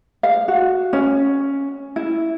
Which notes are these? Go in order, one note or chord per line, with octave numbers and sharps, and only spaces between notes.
F5
F#4
C#4
E4